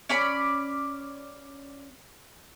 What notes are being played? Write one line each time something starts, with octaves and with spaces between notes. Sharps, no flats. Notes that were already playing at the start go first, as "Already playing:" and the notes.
C#4 D5 B5